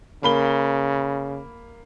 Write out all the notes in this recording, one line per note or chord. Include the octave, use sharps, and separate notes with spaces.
C#3 A#3 B5 G7